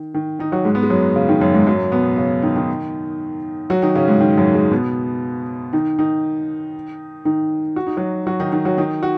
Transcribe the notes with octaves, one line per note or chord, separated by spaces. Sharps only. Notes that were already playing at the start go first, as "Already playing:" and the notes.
Already playing: D#3
D#3
D#3 D#4
F#3 F#4
G#2 G#3
B3
G#3
F#2 F#3
C#3
D#3
F#2 F#3
G#2 G#3
F#2 F#3
B2 B3
C#3 C#4
D#3 D#4
D#3 D#4
F#3 F#4
D#3 D#4
C#3 C#4
G#2 G#3
D#3
F#2 F#3
G#2 G#3
B2 B3
D#3 D#4
D#3 D#4
D#3 D#4
F#4
D#4
F#3 F#4
F#3 F#4
D#3 D#4
D#3 D#4
F#3 F#4
D#3 D#4
F#4